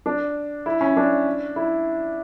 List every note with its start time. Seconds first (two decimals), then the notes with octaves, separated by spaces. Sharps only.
0.06 D4
0.66 E4
0.81 C#4
0.97 D4
1.56 E4